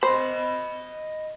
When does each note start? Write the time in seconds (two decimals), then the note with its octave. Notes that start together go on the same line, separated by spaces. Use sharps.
0.03 C5 D#5 B5